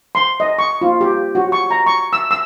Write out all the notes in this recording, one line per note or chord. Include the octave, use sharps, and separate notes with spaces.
C6
D#5
C#6
F4
G4
F#4
C#6
A#5
C#6
E6
E6